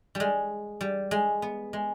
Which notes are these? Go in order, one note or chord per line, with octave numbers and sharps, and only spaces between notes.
G3
G#3
G3
G#3
B3
G#3